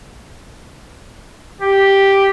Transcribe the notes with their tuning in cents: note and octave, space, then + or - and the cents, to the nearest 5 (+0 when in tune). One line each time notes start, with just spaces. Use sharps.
G4 +0